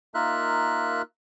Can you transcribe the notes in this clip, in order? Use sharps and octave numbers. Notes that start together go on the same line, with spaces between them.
A#3 D#4 F4 A#4 E5 F#6